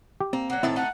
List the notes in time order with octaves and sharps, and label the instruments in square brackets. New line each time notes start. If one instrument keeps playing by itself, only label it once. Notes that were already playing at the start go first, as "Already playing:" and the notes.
[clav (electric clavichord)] G4
[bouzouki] A#3 [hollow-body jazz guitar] C4
[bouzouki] F#3 A#3 [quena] F#5
[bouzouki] A2 D#3 A4 [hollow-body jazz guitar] C4 [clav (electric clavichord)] E4
[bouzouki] A3 D#4 F#4 [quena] F#5